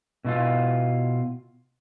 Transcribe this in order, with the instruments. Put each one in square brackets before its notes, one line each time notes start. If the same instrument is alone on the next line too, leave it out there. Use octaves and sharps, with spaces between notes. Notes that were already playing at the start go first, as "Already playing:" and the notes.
[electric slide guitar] B2 E4 F4